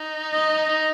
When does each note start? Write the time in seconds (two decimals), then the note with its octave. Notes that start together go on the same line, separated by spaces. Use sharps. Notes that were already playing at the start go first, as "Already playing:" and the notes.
Already playing: D#4
0.33 D#5
0.69 D#4